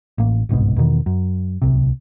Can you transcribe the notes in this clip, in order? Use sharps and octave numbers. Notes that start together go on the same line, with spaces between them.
A1 A2 A#3
G1 C2 G#2 B2
E2 B2 D#3
F#2
D1 C2 C3